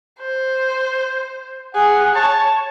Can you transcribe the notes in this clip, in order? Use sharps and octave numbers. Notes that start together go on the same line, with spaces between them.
C5
G#4 F#5
C#5 A5